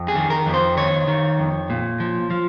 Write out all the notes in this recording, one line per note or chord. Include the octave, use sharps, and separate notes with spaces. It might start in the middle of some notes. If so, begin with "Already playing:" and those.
Already playing: F2
G#4
D#3
A#4
F2
C5
D#3 C#5
D#3
F2
A#2
F3
F3